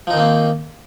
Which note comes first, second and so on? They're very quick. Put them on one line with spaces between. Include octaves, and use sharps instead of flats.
F3 D#4 D#3 C4 A#3